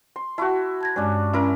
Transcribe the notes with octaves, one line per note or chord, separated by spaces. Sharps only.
C6
E4 F#4 A5 C#6
A5 G#6 A#6
G2 G#3 C#4 D4
C#4 E4 A#4